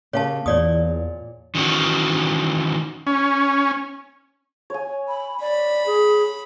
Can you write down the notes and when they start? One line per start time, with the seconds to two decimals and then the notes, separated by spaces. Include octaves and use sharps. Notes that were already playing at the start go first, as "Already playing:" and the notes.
0.13 C#3 A#3 G4 C#5 F5 A5
0.46 E2 A#2 C#5 D5 D#6
1.55 D#3 E3 C#4 F#4
3.07 C#4
4.70 C#5 G#5
5.08 B5
5.41 D5 B5
5.86 G#4